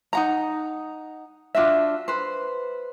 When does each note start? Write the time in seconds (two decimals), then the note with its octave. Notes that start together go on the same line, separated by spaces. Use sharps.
0.13 D#4 F#5 A#5
1.55 D4 F4 F#4 E5
2.08 B4 C5